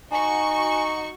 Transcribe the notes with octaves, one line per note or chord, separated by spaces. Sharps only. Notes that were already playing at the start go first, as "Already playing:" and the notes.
D#4 F#4 G#5 C#6